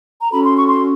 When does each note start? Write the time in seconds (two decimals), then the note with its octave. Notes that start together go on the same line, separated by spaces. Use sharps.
0.21 A#5
0.32 C#4 F#4 A4 B5
0.44 C6
0.57 C#6
0.69 C6